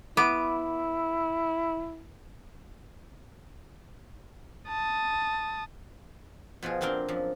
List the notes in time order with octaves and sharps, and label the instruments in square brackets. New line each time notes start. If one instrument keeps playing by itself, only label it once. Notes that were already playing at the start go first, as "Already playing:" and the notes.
[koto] B3 [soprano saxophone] E4 [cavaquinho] D6
[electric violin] A5 D#6
[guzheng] B2 F3 F4 G#4
A#2 C4 D4 A#4 G5 C6
F#2 F3